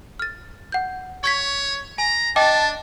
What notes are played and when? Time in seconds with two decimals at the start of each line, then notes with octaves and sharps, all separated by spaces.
0.19 F6 A6
0.72 F#5 G6
1.24 C#5 C#6 G#6 B6
1.98 G#5 A#5
2.36 D4 D#5 G5 A5 D6